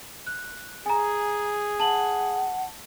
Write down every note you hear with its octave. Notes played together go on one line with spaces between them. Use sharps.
F#6
G#4 G#5 A#5
F#5 A5 F#7